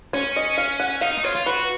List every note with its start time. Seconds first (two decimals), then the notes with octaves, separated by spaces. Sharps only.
0.13 C#4 C#5
0.36 D#5
0.58 F5
0.80 F#5
1.01 D#4 F5
1.18 D#4
1.24 F4 C#5
1.35 F4
1.46 F#4 B4